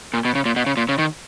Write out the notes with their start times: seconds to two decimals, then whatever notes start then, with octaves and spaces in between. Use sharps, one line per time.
0.14 A#2
0.25 B2
0.35 C#3
0.45 A#2
0.56 B2
0.66 C#3
0.77 A#2
0.89 C#3
0.98 D#3